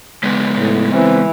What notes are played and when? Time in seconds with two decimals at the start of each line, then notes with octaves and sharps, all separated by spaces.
0.23 C#3 G#3 B3
0.57 A2
0.93 E3 C4